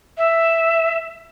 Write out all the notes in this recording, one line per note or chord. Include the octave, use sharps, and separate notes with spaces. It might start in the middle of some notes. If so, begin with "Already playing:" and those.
E5